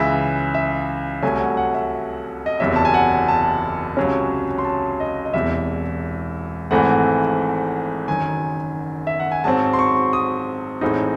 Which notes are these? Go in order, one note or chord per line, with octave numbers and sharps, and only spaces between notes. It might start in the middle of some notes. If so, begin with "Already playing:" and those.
Already playing: C#2 C#3 E3 E5
E5
C2 C3 F#3 A3 G#5
F#5
F#5
E5
D#5
F#1 E2 C3 F#3 E5
A5
G#5
F#5
A5
C#2 C3 F#3 C#4
C6
A5
D#5
D#5
E1 E2 C3 E5
G#1 G#2 E3 A3 C4 F#5
F#1 F#2 D#3 G#5
E5
F#5
G#5
G#2 F#3 C4 A5
C6
C#6
D#6
A1 A2 G#3 C4 D#4